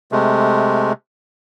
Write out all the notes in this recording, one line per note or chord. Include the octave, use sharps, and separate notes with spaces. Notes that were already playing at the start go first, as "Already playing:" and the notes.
C3 G#3 A3